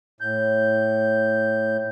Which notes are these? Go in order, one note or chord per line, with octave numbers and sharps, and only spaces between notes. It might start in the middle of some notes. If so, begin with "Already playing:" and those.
A2 G6